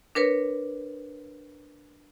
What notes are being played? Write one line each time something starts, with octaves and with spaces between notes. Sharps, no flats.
D4 A#4 B4 C#5